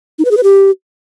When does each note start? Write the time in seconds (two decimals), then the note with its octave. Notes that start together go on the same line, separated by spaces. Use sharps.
0.19 D#4
0.25 B4
0.31 G#4
0.37 B4
0.43 G4